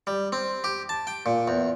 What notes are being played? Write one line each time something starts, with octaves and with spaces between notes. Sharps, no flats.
G3
C4
G4
A5
G5
A#2
E2